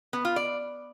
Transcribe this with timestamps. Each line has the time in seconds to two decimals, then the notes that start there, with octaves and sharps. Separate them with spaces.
0.13 B3
0.25 F4
0.36 D5